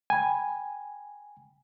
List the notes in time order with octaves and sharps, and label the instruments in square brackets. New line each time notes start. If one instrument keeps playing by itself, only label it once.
[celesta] G5 B5 [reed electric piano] G#5